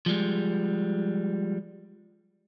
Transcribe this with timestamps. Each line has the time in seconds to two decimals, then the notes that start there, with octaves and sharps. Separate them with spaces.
0.06 F3 G3 G#3